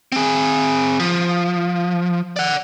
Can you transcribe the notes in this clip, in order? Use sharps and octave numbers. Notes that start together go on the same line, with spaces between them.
C4 G#4
F3
D5 F#5